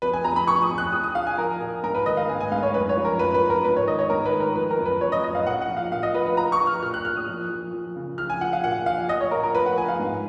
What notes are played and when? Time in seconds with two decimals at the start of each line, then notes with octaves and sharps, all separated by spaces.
0.02 F2 B4
0.13 G#5
0.24 F2 A#5
0.36 B5
0.47 F3 C#6
0.62 D#6
0.70 F2
0.78 F#6
0.92 F3 D#6
1.04 D#6
1.15 F3 F5
1.27 G#5
1.38 F3 A#4
1.61 A#2
1.83 G#2 A#4
1.95 B4
2.06 D#3 D#5
2.17 F5
2.29 G#2 G#5
2.40 G#5
2.51 G#2 F5
2.63 C#5
2.74 F#2 B4
2.89 C#5
2.97 F3
3.05 A#4
3.19 F#2 B4
3.34 B4
3.42 F3
3.50 A#4
3.64 G#2 B4
3.76 C#5
3.87 D#3 D#5
3.99 C#5
4.10 G#2 A#4
4.26 B4
4.33 D#3
4.40 A#4
4.56 F3 B4
4.71 A#4
4.78 F#2
4.86 B4
5.01 F3 C#5
5.12 D#5
5.23 F#2 D#5
5.35 F5
5.46 A#2 F#5
5.61 F#5
5.69 F3
5.77 F5
5.91 A#2 F5
6.03 D#5
6.14 F3 B4
6.26 B4
6.37 F3 A#5
6.52 C#6
6.60 F3
6.67 F6
6.82 A#2 F6
6.94 F#6
7.05 A#2 F6
7.16 D#6
7.28 F3
7.50 F3
7.73 F3
7.96 C#3
8.18 F3 F6
8.30 G#5
8.41 F3 F#5
8.53 F5
8.64 A#2 F#5
8.86 F3 F5
9.09 F3 D#5
9.21 C#5
9.31 A#2 A#4
9.44 A#4
9.55 F3 B4
9.66 F#5
9.78 F3 G#5
9.88 F5
9.99 G#2